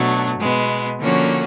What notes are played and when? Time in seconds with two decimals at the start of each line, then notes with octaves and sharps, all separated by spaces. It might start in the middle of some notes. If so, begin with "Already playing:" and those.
Already playing: B2 F#3 A3 D4
0.39 B2 G#3 B3
0.99 D3 F3 A#3 C#4 F#4